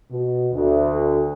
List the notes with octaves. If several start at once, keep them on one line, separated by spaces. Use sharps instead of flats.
B2
D2